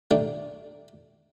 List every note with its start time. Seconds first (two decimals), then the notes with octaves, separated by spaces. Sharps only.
0.11 A3 D4 D#4 G4